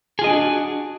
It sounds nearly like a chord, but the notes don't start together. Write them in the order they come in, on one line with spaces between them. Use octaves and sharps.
G#4 F4 D#5 D4 F#4